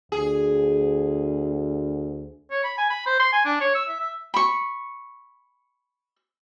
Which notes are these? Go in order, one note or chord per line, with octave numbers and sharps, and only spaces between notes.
D2 G#4
C#5
B5
G#5
B5
C5
C6
G#5
D4
C#5
E6
E5
E5
B5 C#6